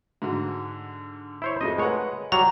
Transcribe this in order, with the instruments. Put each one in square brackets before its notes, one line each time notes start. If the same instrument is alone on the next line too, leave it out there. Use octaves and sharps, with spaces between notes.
[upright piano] G#2 D3 F#4
[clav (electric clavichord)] E4 C5 C#5
[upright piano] F2 G#3 A3 [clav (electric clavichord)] D#5
[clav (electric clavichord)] G#3 C#5 [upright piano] A#4 B4 F#5
[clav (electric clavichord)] F#3 G3 F#4 [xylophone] A#5